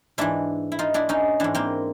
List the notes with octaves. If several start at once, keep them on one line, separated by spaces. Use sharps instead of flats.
G#2 E3 D4 E4
E4
D#4 F4
D4 E4
C#4 D#4
G#2 E3 D4 E4
A#3 C4